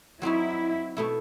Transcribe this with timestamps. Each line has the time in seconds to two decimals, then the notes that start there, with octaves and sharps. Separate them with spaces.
0.22 F#3 C4 D#4 E4 F#4
0.97 B2 A3 E4